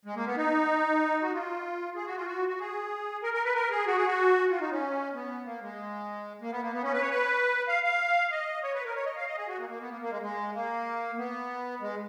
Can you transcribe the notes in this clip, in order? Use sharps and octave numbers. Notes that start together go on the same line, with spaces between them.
G#3
A#3
B3
D#4
F#4
F4
G#4
F#4
F4
F#4
F#4
G#4
A#4
A#4
B4
A#4
G#4
F#4
G#4
F#4
F4
D#4
C#4
B3
A#3
G#3
A#3
B3
A#3
B3
C#4
B4
C#5
B4
F5
F5
D#5
C#5
B4
A#4
C#5
D#5
F5
D#5
G#4
F#4
A#3
A#3
B3
A#3
A#3
G#3
G#3
A#3
B3
G#3